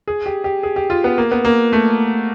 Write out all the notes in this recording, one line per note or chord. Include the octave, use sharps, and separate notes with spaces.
G#4
G4
G4
G#4
G4
F4
B3
A#3
B3
A#3
A3